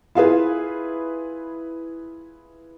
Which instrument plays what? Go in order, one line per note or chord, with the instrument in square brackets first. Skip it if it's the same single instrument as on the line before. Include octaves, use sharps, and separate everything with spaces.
[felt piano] E4 F4 G#4 B4